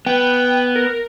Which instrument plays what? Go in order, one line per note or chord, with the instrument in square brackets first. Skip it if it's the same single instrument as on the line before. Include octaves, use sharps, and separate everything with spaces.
[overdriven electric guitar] B3 [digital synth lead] G5
[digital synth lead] A#4